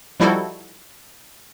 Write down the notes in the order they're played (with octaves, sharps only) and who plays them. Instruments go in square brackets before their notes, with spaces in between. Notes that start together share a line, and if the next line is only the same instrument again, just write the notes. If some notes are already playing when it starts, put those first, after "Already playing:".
[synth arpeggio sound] F3 G3 D#4 E4 F#4 A4